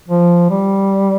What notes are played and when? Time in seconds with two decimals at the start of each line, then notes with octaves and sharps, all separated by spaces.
0.08 F3
0.50 G3